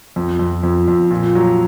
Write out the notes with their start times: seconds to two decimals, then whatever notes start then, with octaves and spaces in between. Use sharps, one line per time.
0.16 F2
0.39 F2
0.63 F2
0.88 F2
1.11 A#2
1.35 F#3